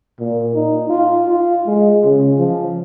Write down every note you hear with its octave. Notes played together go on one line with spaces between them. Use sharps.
A#2
D#4
F4
F4
G#3
C#3
F3